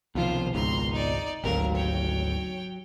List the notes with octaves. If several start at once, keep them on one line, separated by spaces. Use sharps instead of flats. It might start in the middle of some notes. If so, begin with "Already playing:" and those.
C2 B2 D#3 F3 F4 C5
G#1 C#2 A#5 C6
D#4 D5
G#1 D2 F#3 G4 A#4 F5
C#5 G5